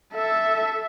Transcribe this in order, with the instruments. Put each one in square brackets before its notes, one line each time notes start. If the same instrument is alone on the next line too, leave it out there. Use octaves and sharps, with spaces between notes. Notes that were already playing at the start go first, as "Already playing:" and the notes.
[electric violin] A4 E5